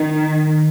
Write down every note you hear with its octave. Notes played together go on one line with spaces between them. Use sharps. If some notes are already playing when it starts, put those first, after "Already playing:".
Already playing: D#3